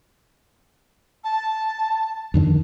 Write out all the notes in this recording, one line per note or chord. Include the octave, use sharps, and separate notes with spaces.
A5
F2 D3 D#3